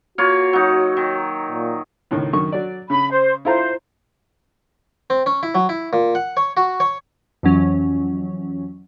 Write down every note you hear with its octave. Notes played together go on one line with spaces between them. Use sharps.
A#3 F4 F#4 C#5
F#3 D#4
D#3
A#2
C#2 A2 D#3
F#2 D#3 C#6
F#3 D5
C#3 B5
C5
E4 F4 C5 A#5
C4
C#4
E4
F#3
E4
A#2
F#5
C#5
F#4
C#5
F2 E3 F#3 C#4